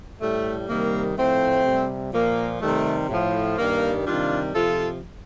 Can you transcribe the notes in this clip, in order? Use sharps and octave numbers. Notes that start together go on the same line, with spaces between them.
A2 G3 A3
C3 D#3 G3 A#3
A2 F3 A3 C4
C3 G3
A#2 F3 A#3
C3 D#3 G3 A3
A2 F3
G2 D#3 G3 A#3
C3 D#3 G3 D4 F4
C3 F3 F4 A4